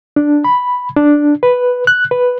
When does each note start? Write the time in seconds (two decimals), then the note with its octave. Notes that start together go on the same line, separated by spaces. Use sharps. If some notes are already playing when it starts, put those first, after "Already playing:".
0.16 D4
0.44 B5
0.97 D4
1.43 B4
1.87 F#6
2.11 B4